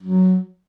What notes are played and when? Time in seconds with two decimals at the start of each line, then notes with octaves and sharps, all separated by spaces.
0.03 F#3